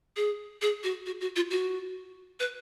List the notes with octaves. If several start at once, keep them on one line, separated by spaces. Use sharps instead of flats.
G#4
G#4
F#4
F#4
F#4
F4
F#4
B4